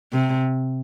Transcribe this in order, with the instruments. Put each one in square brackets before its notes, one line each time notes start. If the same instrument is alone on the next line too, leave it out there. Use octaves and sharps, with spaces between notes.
[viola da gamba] C3